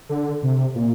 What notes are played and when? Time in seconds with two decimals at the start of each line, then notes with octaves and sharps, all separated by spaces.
0.09 D3
0.43 C3
0.75 A#2